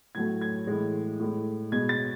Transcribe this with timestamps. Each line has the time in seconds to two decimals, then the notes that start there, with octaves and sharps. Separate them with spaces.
0.15 A2 F#3 A3 G#6
0.41 G#6
0.67 A2 E3 G#3
1.20 A2 G#3
1.72 B2 G#3 G#6
1.89 A6